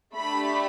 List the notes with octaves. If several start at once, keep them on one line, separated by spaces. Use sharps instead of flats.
A3 D4 G4 B5